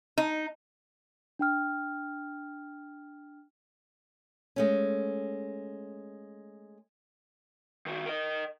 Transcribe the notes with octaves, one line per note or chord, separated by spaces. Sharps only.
D#4
D4 G5 F6
G#3 A3 C#4
D#3 F#4
A#4 D#5